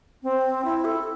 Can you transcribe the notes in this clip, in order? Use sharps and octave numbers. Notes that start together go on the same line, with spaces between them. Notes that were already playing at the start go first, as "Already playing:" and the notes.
C4
E4
A4